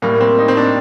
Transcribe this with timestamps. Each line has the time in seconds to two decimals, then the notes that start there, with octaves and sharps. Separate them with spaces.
0.02 A2 G3 A#3
0.20 C4
0.39 D#4
0.48 C4
0.57 D4